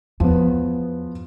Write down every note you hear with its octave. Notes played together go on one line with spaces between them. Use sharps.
E2 F3 B3